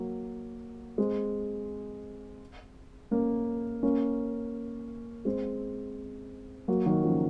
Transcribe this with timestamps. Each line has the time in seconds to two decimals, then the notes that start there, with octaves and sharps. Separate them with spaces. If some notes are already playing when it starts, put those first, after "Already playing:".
Already playing: F#3 A#3
0.98 G#3 C4
3.11 A#3 C#4
3.83 A#3 C#4
5.25 G#3 C4
6.68 F#3 A#3
6.86 D#3 F#3
7.04 C#3 F3